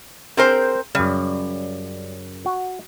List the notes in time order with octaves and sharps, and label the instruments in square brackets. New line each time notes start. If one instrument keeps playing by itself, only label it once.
[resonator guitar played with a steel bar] C4 A#4 C5 [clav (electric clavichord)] G#4
[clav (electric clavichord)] F#2 C#3 [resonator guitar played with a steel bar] G3
[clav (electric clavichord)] F#4